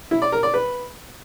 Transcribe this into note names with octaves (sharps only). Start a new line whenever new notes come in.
E4
D5
A#4
D5
B4